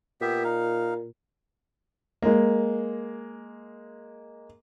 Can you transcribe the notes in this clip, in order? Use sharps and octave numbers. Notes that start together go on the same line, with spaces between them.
A#2 B3 G4 E5
D#4 F5
G#3 A#3